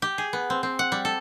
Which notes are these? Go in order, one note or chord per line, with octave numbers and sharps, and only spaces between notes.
G4
G#4
B3
C4
C4
F#5
G3
A4